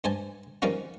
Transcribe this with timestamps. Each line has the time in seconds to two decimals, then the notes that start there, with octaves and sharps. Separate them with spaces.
0.04 G2 C5 G#5 A5
0.62 D#3 F3 G3 A#3 C#4 F4